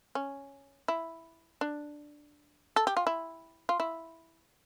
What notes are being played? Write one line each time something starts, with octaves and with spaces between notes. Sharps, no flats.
C#4
E4
D4
A4
G4
F4
E4
F4
E4